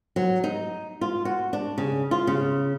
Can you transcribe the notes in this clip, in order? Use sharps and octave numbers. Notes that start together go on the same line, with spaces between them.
F#3
D#4
F4
F#4
D4
C#3
F4
C#3